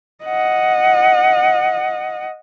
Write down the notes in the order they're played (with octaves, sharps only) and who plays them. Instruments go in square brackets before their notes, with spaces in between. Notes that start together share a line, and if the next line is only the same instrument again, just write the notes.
[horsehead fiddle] D#5 F#5